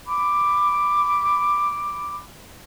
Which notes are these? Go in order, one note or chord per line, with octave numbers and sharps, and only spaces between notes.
B5 D6